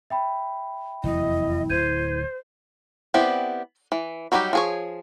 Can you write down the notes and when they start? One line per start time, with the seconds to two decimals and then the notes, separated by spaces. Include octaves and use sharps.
0.10 E5 G5 B5
1.04 F1 E2 F#3 E4 D#5
1.70 D1 C5 G6 G#6 D#7
3.14 B3 C4 E4 G4 D5
3.92 E3
4.32 F#3 G3 D#4 F#4 G4
4.53 F3 G#4 C#5